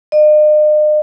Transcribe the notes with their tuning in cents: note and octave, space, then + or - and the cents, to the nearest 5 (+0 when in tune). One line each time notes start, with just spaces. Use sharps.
D#5 -45